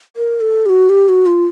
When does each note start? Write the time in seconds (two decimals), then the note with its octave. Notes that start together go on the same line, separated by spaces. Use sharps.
0.16 A#4
0.41 A4
0.66 G4
0.69 F#4
0.89 G4
1.09 F#4
1.26 F4